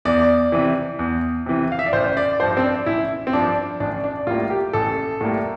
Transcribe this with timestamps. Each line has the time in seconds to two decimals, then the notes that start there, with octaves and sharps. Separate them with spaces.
0.05 E2 D5
0.52 C3 E3
0.99 E2
1.46 C3 E3
1.72 F5
1.79 E5
1.86 D5
1.93 A1 C5
2.17 D5
2.39 F3 C5
2.42 G2
2.57 C4
2.63 D4
2.86 A1 E4
3.27 C4
3.33 G2 F3 D4
3.80 A1 D4
4.04 D4
4.27 A2 G3 A#3 F4
4.50 G4
4.73 A1 A4
5.21 A2 G3 A#3